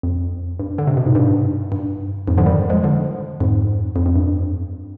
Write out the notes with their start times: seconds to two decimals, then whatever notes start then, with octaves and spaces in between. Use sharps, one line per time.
0.03 F2
0.59 G2
0.78 D3
0.87 C3
0.97 B2
1.06 G#2
1.15 G2
1.72 G2
2.28 F2 G#2
2.37 D3 F3
2.46 D#3 G3
2.70 F3 G#3
2.83 D3 F3
3.40 F2 G#2
3.96 F2
4.06 F2
4.15 G2